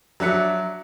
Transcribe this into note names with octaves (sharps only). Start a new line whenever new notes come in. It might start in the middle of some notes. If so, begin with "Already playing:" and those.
F#3 D4 E5 F#6 B6 C#7